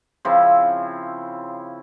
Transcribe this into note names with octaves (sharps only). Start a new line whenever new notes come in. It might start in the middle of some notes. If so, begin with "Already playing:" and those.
C#3 F3 C4 E4